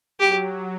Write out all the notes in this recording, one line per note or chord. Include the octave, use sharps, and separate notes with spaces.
F#3 G4